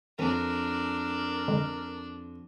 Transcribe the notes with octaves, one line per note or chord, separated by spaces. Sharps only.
F2 E3 C4 D4 A#4 D#7
D3 G#3